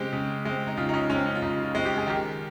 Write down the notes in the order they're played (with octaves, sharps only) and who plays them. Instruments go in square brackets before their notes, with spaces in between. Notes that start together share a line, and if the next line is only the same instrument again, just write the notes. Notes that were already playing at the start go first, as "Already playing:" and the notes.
Already playing: [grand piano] C#3 G#3 C4 G4
C#3
G#3 C4
D#4
C#3 F4
D#4
C#4
G#3 C4 C#4
C#4
F4
C#3 D#4
F4
G#3 C4
G4
G#4
D#3 G4